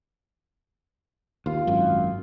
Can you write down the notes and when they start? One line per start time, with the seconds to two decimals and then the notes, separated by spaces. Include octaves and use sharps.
1.46 D#2 F4
1.67 G#1 F#2